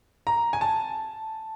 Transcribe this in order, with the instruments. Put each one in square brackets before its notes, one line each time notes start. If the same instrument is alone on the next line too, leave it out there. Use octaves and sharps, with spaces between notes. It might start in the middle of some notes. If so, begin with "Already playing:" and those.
[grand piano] A#5
G#5
A5